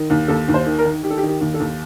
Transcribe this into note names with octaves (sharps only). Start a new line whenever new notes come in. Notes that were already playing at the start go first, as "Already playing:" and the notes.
Already playing: D#3
D#2
D#2 A4
D#2
C5
D#3
A#4
D#3
D#3 G4
A4
G4
D#3
G4
D#2
A4
D#2